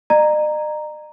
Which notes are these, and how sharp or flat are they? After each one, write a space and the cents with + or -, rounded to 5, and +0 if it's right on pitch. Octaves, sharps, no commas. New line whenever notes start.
D#5 -45 A#5 +0